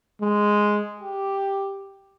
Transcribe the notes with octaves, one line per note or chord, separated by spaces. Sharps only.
G#3
G4